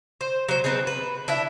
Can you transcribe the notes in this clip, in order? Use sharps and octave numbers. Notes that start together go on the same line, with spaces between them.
C5
F#3 C5
B3 C4 D#4 G#4
B4
D4 E4 E5